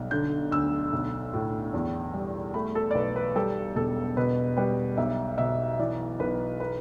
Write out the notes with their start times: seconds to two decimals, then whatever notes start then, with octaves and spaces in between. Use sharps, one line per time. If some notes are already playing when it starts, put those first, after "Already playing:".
Already playing: B1 G3
0.11 D3 G6
0.52 D2 E6
0.93 B1
1.33 A2
1.74 E2
2.14 G3
2.54 A3 B5
2.75 A4
2.91 D5
2.95 B1 B4
3.16 B4
3.36 G3 A4
3.76 E1 A4
4.17 B2 B4
4.57 G3 B4
4.97 B1 E5
5.38 B2 E5
5.79 E3 D5
6.20 B1 B4
6.60 B4